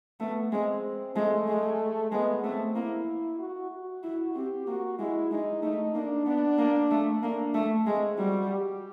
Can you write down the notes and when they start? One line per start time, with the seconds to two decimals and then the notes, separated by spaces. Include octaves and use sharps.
0.20 A3 B3
0.52 G#3 C4
1.16 G#3 A3
1.48 G#3
2.12 G#3 B3
2.43 A3 C4
2.75 A#3 E4
3.39 F#4
3.71 F#4
4.03 E4
4.35 C4 G4
4.67 A#3 F#4
4.99 G#3 E4
5.30 G#3 D#4
5.62 A3 D#4
5.94 A#3 D4
6.26 B3 D4
6.58 A#3
6.91 A3
7.22 A#3 D4
7.54 A3
7.86 G#3 C4
8.18 G3 F#4
8.50 G4